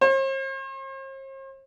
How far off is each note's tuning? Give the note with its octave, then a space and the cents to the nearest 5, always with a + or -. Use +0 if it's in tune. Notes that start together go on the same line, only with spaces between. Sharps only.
C5 +45